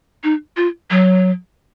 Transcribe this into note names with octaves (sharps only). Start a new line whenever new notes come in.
D#4
F4
F#3